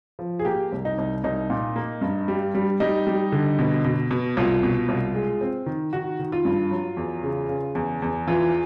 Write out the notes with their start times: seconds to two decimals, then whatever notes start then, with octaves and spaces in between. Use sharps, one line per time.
0.19 F3
0.39 G#4
0.45 A#3 G4
0.72 C2
0.85 D#4
0.98 C2
1.24 C2 D#4
1.50 A#2
1.76 A#3
2.01 G2
2.28 G3
2.55 G3
2.80 G3 D#4
3.07 G3
3.32 D3
3.59 B2
3.84 B2
4.11 B2
4.37 C2 F4
4.63 B2
4.88 C2
5.14 G#3
5.41 C4
5.66 D#3
5.93 D#3 F#4
6.19 D#3
6.32 F4
6.45 G2
6.71 F#3
6.97 E2
7.23 C#3
7.49 C#3
7.75 E2
8.02 E2
8.27 E3 F4